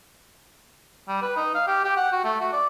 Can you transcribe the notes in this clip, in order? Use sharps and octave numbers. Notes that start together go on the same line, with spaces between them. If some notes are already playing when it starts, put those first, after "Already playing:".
G3
B4
D#4
F5
G4
G4
F#5
F#4
A3
F#4
D5